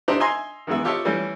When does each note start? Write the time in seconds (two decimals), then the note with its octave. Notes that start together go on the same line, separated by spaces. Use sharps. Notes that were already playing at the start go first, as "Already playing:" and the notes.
0.08 D4 D#4 G4 A4 C5 D5
0.20 D#5 E5 G#5 A#5 C6
0.67 D#3 E3 G#3 B3 E5
0.84 F4 G4 A4 C#5 D#5 E5
1.05 E3 G3 A3 C#4